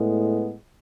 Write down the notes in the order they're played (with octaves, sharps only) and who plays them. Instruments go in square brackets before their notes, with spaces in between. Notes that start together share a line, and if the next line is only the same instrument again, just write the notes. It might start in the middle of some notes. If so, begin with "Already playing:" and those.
Already playing: [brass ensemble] A2 G#3 B3